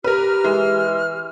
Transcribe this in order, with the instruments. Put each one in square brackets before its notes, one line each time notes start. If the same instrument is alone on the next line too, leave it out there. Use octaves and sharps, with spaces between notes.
[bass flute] G4 [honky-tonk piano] A#4 B4 [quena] F6
[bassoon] E3 [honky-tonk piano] G#3